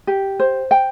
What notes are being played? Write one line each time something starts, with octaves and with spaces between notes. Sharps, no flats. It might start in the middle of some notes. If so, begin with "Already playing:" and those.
G4
C5
G5